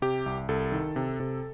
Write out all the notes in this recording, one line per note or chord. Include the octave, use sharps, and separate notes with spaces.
C3 G4
C2
C2 A4
D#3
C3
C3